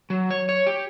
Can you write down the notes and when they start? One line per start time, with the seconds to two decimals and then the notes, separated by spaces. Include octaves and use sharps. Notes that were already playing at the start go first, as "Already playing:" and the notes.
0.10 F#3
0.31 C#5
0.49 C#5
0.67 G4